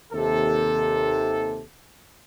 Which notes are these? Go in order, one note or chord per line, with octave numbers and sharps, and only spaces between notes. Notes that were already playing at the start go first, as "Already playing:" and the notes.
D#2 C3 A4